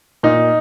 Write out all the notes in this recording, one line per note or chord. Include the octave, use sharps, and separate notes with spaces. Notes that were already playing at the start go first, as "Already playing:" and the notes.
A#2 D#4